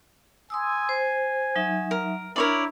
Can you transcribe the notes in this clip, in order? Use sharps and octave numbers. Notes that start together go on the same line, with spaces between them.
G#5 C6 D#6 E6
C5
F#3 D#4 E5
A#4
D4 E4 A#4 C#5 D5